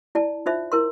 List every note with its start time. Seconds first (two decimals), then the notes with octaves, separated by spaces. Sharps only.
0.15 E4 D5 A5
0.46 D#4 F4 C5 E5
0.72 E4 A#4 C6